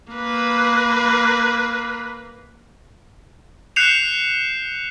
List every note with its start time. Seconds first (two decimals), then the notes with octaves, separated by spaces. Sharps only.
0.13 A#3 B4
3.76 F#6 G6 C7 C#7 E7 F7